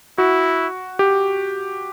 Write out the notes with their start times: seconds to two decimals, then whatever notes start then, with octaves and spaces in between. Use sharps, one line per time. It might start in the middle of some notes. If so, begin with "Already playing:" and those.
0.18 E4 F#4
0.99 G4